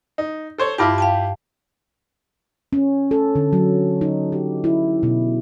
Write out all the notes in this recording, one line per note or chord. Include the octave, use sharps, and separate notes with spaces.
D#4
A4 C5 C#5
G2 E4 F4 G4 A5 D6
F5 G5 A5
C#4
A4
D3
F#3
D#4
G4
E4
B2